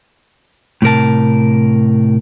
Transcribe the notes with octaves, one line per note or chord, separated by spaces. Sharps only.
A2 C3 A#4 A5